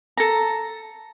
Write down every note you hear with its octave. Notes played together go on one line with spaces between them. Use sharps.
A4 A#5